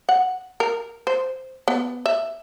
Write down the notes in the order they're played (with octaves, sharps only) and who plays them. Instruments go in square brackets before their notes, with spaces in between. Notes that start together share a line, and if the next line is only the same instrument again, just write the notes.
[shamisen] F#5
A#4
C5
B3
E5